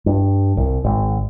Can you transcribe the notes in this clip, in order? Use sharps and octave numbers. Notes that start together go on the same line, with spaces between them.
G2
C2
G#1